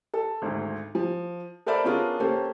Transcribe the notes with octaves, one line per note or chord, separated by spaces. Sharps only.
A4
G#1 D2
F3
A4 A#4 C5 D5 E5 B5
B3 C#4 D4 F4 G#4 A#4
A#3 C#4 G4 A4 C5